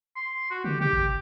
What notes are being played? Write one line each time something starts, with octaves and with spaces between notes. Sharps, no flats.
C6
F#4
D3 G4
C3 G4
G#1